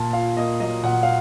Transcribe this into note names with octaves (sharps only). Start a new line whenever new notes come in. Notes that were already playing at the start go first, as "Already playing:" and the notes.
Already playing: A#2 A5
F4 F5
A#3 D#5
F#3 D#5
A#2 F#5
F5